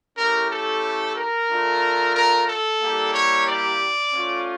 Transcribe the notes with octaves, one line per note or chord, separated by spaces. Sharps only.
A3 C#4 E4 G4 A#4
A4
A#4
A3 D4 F4
A#4
A4
G3 A#3 E4 G4
C#5
D5
A3 C#4 F4